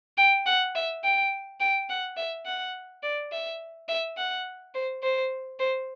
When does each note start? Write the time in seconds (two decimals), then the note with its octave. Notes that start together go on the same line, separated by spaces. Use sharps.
0.18 G5
0.46 F#5
0.75 E5
1.04 G5
1.60 G5
1.89 F#5
2.17 E5
2.46 F#5
3.03 D5
3.32 E5
3.88 E5
4.17 F#5
4.75 C5
5.03 C5
5.59 C5